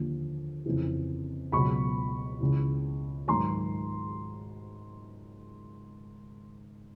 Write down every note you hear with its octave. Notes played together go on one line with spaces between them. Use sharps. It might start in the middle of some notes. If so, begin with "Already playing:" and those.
Already playing: D#2 D3 F3
F2 C#3 E3
C#2 B2 F#3 B5 C#6
C#2 C#3 E3
G#2 D#3 F#3 A#5 C6